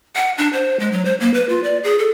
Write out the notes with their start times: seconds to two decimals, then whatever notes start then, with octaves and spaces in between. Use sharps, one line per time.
0.16 F#5
0.38 D4
0.53 C5
0.80 G#3
0.92 F#3
1.05 C5
1.20 A#3
1.34 B4
1.49 F4
1.64 D5
1.84 G#4
1.99 A4